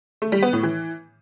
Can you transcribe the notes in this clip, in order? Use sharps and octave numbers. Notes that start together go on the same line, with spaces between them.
A3
G3
B3
A2
E3